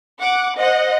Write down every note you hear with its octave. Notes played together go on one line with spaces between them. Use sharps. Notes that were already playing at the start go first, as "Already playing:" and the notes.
F#5 D6
C5 D#5 F#5